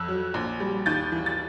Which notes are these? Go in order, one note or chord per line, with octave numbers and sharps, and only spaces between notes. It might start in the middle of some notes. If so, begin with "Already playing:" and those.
Already playing: F2 E6 F#6
F#3
A#1
G3
D#2 G6 A6
E3
A6